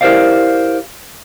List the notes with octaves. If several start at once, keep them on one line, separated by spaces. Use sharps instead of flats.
E4 G4 A#4 C5 D5 F5